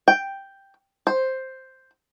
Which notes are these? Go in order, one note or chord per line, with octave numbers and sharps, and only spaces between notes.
G5
C5